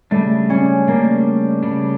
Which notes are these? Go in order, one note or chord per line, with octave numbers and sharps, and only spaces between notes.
C#3 G3 A3 D4
C#4
C#3 G3 A#3 D4
C#3 G3 D4